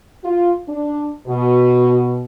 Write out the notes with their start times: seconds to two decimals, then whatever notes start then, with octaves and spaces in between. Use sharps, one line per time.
0.24 F4
0.68 D4
1.27 B2